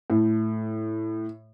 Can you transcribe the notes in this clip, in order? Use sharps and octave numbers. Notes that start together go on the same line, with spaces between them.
A2